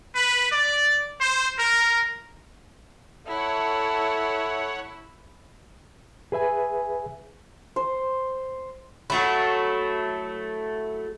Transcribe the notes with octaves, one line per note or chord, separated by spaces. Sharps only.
B4
D5
C5
A#4
E4 A4 C#5 E5 F#5
G#4 B4 E5 G#5
C5
F#3 A3 E4